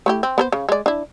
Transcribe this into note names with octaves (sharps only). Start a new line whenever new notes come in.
A3 E4 G4
C4
B3 A4 C5
C#3
G#3 D5
D4 E4